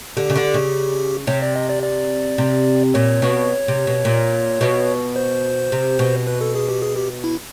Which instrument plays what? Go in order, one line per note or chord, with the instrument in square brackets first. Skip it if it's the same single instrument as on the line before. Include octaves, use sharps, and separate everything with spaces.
[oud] D3 [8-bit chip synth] G4
[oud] C#3
D3
C#3
[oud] C3 [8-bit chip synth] C#5
[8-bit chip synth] D5
D#5
D5
D5
[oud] C3
[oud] A#2 [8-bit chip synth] C#5
[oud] B2
C3
B2
A#2
B2
[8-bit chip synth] C5
[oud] C3
B2
[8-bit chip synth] B4
A4
G#4
G4
G#4
G4
E4